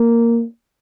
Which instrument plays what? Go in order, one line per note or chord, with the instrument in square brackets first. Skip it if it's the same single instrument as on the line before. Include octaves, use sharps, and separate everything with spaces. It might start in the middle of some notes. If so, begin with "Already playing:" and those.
Already playing: [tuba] A#3